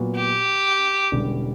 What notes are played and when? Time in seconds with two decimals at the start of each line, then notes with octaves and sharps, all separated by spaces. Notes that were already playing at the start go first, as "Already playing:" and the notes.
Already playing: A#2 F#3 B3 F#4
0.16 G4
1.12 E1 E2 D3 G3 C#4